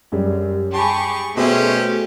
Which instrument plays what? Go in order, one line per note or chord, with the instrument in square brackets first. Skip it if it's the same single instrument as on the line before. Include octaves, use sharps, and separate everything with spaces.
[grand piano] F#2 G3
[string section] G4 G#4 [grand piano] A5 B5 [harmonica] C#6
[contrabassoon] B2 [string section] A3 [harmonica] C#4 G4 C5 [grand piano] G#4 E5